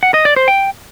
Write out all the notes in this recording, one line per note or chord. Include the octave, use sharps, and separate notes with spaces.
F#5
D#5
D5
C5
G5